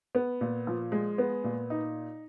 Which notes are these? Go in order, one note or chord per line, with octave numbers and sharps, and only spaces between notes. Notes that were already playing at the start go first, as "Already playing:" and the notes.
B3
A#2
F3
G#3
B3
A#2
D#4